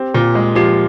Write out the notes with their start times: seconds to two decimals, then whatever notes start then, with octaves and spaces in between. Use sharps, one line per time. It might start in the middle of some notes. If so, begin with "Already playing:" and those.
Already playing: C4 G4
0.14 A#2
0.35 G#3
0.55 F3 G4